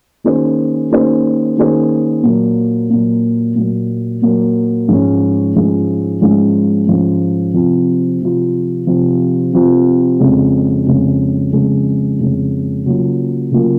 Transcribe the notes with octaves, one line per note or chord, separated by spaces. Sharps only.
D#3 A#3 C#4 G#4 C5
D#3 A#3 C#4 G#4 C5
D#3 A#3 C#4 G#4 C5
A#2 F#3 A#3
A#2 F#3 A#3
A#2 F#3 A#3
A#2 F#3 A#3
G#2 F3 G#3 C#4
G#2 F3 G#3 C#4
G#2 F3 G#3 C#4
G#2 F3 G#3 C#4
C3 F3 C4 F4
C3 F3 C4 F4
C3 F3 C4 F4
C3 F3 C4 F4
F2 C#3 G#3
F2 C#3 G#3
F2 C#3 G#3
F2 C#3 G#3
C#3 F#3 A#3 F4
C#3 F#3 A#3 F4